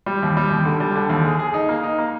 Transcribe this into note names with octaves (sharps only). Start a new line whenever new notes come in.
G3
D#2
G3
D#2
D3
G3
D3
D#2
G#4
G#4
D#4
A#3
D#4
A#3